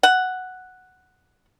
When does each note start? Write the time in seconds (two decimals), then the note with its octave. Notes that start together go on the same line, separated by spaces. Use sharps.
0.03 F#5